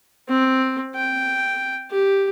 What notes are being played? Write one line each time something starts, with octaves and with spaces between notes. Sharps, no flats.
C4
G5
G4